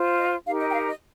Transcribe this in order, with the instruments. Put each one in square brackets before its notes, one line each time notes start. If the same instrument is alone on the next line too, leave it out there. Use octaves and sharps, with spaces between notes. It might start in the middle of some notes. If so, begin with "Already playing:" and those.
Already playing: [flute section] F4 C5
D#5
D#4 G4 A#4 F5
D#5
G5
F5
D#5